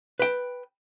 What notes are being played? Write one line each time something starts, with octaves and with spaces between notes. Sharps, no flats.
B4 G5